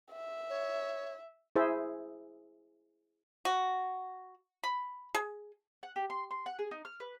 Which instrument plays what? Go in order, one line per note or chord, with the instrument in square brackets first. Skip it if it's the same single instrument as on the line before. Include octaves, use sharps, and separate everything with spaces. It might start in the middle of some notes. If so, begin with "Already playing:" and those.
[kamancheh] E5
[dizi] C#5
[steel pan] E4 G#4 C5 E5
[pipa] F#4
B5
G#4
[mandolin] F#5
G4
C6
C6
F#5
G#4
D#4
F6
B4